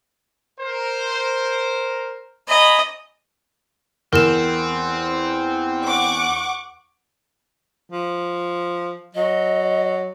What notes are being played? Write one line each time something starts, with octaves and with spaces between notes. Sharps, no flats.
A#4 C5
D#5 G#5 A#5 B5
E2 C4 A#4 E7
F#5 C#6 D6
F3
F#3 D#5